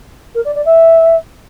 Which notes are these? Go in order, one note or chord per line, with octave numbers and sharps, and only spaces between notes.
A#4
D5
D5
E5